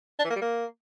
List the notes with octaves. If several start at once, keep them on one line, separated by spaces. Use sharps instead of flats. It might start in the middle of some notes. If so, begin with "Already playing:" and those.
D4
E3
A#3
G3
A#3